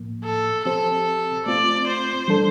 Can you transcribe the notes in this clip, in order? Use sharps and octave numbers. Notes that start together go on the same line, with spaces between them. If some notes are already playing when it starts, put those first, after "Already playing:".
Already playing: A2 F3 A#3
A4
F3 C4 G4 A4 C5
A3 C4 F4 D5
C5
E3 G3 D4 A4